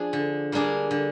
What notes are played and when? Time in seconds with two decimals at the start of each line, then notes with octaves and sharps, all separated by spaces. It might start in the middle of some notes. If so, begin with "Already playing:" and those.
Already playing: F3 D4 G#4
0.13 D3
0.52 G3 A#3 D4 G#4
0.91 D3